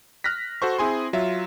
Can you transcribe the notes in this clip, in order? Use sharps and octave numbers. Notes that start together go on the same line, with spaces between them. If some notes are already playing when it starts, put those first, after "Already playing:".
F6 F#6 A#6 B6
F#4 A4 C5 C#6
C4 E4 G#4 G#5 C6
F#3 F4 E5